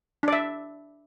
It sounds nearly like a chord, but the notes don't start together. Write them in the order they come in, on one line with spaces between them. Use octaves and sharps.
D4 D5 E5